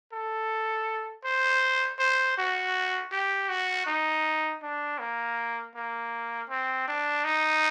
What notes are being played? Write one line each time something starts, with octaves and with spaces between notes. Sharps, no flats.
A4
C5
C5
F#4
G4
F#4
D#4
D4
A#3
A#3
C4
D4
D#4